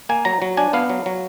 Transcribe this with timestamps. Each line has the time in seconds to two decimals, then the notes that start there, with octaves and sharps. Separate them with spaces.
0.09 A#3 G#5
0.25 F#3 A#5
0.42 F#3
0.57 D4 G#5
0.73 B3 F5
0.89 F#3
1.06 F#3